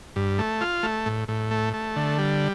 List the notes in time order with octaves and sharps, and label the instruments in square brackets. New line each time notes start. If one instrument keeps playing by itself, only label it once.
[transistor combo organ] G2
A3
F4
A3
A2
A2
A3
A3
D3
G3